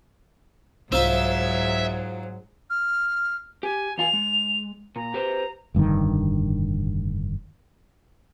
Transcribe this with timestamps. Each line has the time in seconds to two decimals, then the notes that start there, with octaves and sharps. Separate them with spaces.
0.92 C2 G#2 F#3 D#4 F4 C5 E5
2.70 F6
3.63 G4 G#5
3.98 E2 F4 G#5 F7
4.13 G#3
4.96 A#2 A#5
5.14 G4 B4 C5
5.74 F1 G2 D3 D#3